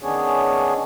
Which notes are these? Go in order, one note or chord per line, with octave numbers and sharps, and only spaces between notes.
D#3 B3 C#4 D4 G#4 C#5